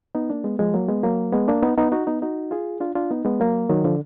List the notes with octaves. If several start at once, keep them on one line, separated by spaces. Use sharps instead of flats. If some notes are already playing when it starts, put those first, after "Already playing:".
B3 D#4
A#3 D4
G#3 B3
F3 G#3
F#3 A#3
G#3 B3
F#3 A#3
G#3 B3
A#3 D4
B3 D#4
B3 D#4
D#4 F#4
B3 D#4
D#4 F#4
F4 G#4
D4 F4
D4 F4
B3 D#4
G#3 B3
F#3 A#3
D#3 F#3
D3 F3